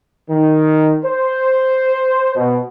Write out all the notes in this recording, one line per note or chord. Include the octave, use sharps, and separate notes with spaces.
D#3
C5
B2